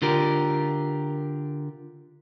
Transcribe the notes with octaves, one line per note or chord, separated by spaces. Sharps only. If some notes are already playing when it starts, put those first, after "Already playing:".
D3 F4 G4 A#4